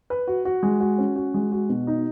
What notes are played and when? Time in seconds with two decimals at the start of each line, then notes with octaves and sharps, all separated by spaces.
0.10 B4
0.27 F#4
0.45 F#4
0.63 G#3
0.80 F#4
0.98 C#4
1.16 F#4
1.34 G#3
1.52 F#4
1.69 B2
1.87 D#4